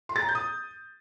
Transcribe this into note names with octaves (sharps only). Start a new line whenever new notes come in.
C6
A6
A#5
G6
D#6